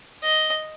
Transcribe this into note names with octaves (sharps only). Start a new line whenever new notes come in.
D#5